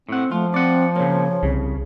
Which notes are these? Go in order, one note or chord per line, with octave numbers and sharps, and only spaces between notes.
A2 C4 F#5
F3 A3 F4
C4 D5 F#5
C#3 A#3 C#5
C2 C#3